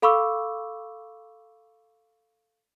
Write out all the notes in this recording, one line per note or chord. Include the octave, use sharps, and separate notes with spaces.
A4 F5 B5 C#6 D6 E6